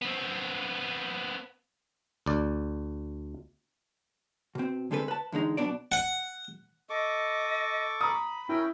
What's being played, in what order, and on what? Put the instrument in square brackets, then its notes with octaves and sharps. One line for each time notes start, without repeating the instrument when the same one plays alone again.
[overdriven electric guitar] B3 C4
[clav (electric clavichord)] D2 D5
[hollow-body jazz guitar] B2 C4
D3 G#3 C4 A4 B4
B4 A5
E2 D3 G#3 D#4
B1 B2 D4 D5
[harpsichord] F#5
[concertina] A4 C#6 D6 [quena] D#5
[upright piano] A#5 D#6 [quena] B5
[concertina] C#4 A#4 G5 [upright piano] E4